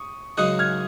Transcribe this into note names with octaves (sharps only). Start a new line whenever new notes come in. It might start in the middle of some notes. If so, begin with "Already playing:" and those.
Already playing: C#6 D#6
F#2 C#3 G#3 D#4 F#4 D#6 F#6
F6 G#6